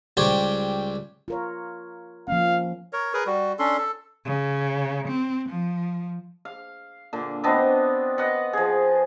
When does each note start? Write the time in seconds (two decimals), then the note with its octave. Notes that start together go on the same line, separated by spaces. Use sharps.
0.17 C#2 G3 G4 C5 C#5
1.28 F4 A#4 C#5
2.28 F3 A#3 C#4 F5
2.93 A#4 C#5
3.13 G#4 A#4 B4
3.26 G3 F#4
3.59 C#4 D4 A4 C6
3.77 A4
4.25 C#3
5.08 C4
5.48 F3
6.45 F5
7.13 A#2 D3
7.44 B3 C4 D4 D#5
8.18 B4 D#5 F#5
8.53 F3 G#4